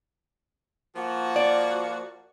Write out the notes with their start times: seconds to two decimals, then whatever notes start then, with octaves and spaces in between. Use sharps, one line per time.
0.95 F3 A#3 F#4
1.36 D5